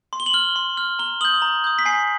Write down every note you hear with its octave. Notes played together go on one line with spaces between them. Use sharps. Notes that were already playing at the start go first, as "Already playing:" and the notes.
C6
G7
F#7
F6 G7
C6
F6
A#5 G7
D#6 G6 F#7
A#5
D#6 G6
B6
G#5 C7